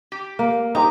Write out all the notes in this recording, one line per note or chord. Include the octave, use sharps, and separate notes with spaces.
G4
A#3
D#4 G4 C5 A#5